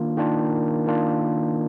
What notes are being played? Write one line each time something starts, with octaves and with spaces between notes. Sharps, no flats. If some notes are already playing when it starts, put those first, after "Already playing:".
Already playing: D#3 A#3 D4 F4
D#3 A#3 D4 F4
D#3 A#3 D4 F4